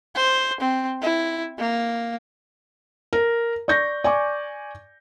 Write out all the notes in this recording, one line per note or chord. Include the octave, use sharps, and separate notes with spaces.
C5
C4
E4
A#3
A#4
D5 C#6 G6 A#6
D5 G#5 C#6 D6